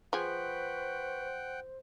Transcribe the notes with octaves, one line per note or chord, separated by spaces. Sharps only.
F3 G#4 B4 C5 F#5 G5 C6 C#6